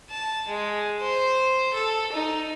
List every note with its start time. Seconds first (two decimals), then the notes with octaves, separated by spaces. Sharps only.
0.10 A5
0.48 G#3
1.00 C5
1.74 A4
2.12 D#4